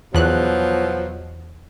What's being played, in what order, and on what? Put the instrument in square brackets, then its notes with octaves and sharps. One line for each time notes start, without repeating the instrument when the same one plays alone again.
[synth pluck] E2 F#6 [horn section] B2 F3 F#3